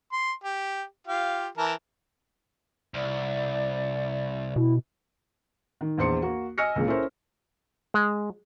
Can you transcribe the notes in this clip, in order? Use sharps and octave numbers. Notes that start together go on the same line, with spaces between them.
C6
G4
F4 G4 F5
E3 A#4 A5
C2 D5
B2 E4
D#3
A#1 E2 C5 C6 C#7
A#3 F#4
D#5 G#5 E6 F6 A#6 C#7
C#2 A#2 C#3
C#4 E4 A4 A#4 C5 C#5
G#3